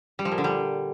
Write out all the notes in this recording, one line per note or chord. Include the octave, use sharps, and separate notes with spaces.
G3
F3
A#2
D3
G3